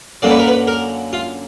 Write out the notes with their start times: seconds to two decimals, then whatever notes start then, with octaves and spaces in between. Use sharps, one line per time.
0.22 F#2 D3 F#3 A#3 D5
0.30 B4
0.39 A#4
0.48 B4
0.68 A#4
1.13 F4